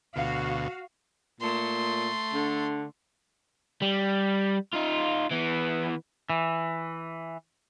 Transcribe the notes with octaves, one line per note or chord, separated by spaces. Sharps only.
D2 B2 F#4 F5
A#2 A3 C6
D3
G3
D#4 F4
E3 B3
E3